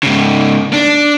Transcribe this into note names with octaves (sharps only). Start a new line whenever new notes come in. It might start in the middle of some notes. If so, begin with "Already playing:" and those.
G#2 C#3
D4